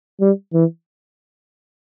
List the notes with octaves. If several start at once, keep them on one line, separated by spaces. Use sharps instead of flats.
G3
E3